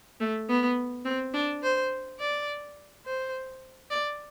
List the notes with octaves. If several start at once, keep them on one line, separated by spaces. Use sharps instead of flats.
A3
B3
C4
D4
C5
D5
C5
D5